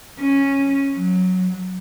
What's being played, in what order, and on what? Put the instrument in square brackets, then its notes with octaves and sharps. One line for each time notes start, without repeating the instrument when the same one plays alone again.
[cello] C#4
F#3